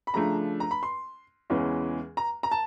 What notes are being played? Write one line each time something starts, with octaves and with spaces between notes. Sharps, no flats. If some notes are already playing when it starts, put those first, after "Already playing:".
B5
C#3 F3 A3 D4 A#5
A#5
B5
C6
E2 C#3 E3 G#3 C#4
A#5
A#5
A5